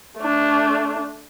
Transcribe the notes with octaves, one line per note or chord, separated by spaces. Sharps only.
A3 D4